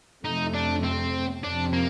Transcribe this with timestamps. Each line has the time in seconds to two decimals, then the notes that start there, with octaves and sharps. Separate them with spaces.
0.24 F2 C3 F3 A3 D#4
0.54 D4
0.83 C4
1.43 F2 C3 F3 D4
1.73 A#3